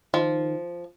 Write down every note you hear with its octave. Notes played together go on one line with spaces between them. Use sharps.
D#3 F3